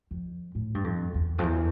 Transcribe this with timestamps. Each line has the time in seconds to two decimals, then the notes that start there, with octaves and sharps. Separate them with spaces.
0.11 F2
0.55 A2
0.75 G2
0.84 F2
1.14 E2
1.38 F2
1.43 E2